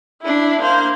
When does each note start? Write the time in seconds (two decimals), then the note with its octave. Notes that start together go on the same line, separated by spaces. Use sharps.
0.21 D4 E4
0.61 A#3 C5